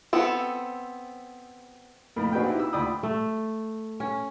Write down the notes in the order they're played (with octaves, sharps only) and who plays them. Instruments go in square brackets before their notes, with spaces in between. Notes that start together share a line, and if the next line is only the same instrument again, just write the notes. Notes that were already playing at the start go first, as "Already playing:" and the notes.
[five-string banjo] B3 C4 A4
[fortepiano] F2 A2 A#4 B5
C4 D4 F#4 G#4 B4 G5
D#4 E4 G4
E6
D2 F4 D5 G5 B5 D#6
[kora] A3
C#4